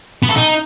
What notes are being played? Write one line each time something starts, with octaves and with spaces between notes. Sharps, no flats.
B3
A4
D#4